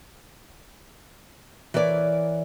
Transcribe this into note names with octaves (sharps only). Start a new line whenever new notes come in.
E3 A#4 C#5 D5